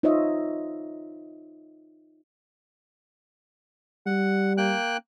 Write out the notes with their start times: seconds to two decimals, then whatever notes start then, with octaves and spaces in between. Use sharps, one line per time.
0.03 D#4 F4 C5 C#5 D#5 E5
4.06 G3 F#5
4.57 A#3 G5 F#6